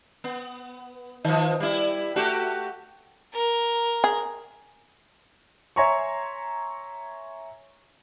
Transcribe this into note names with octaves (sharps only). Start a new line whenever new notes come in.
B3
D#3 F3
G3 E4
A3 F#4 G4
A#4
G#4
C#5 E5 G#5 A#5 C6 C#6